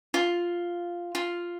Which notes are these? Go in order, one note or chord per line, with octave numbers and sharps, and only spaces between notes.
F4
F4